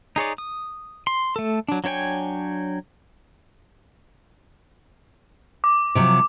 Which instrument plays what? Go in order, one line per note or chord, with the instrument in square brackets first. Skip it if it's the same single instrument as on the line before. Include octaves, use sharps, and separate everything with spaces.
[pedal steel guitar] D#4 G#4 C#5 D5
D#6
C6
A3 A4
F#3 D4
F#3 D4 C#5 G5 G#5
[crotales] D6
[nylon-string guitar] C3 F3 F#3